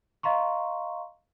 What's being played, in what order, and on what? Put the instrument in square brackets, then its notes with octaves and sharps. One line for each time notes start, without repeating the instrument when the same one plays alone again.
[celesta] D#5 F5 A#5 C6 C#6